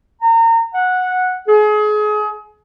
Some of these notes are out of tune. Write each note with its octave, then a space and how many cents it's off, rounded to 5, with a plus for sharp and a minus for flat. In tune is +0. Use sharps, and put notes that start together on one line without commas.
A#5 -30
F#5 -10
G#4 +30